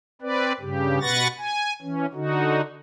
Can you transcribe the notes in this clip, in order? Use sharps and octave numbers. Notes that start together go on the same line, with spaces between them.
C4 B4 D5
G2 C#3 G4
B2 B4 F#5 C#6 A6 A#6
G#5
E3 C#4
D3 D#4 F#4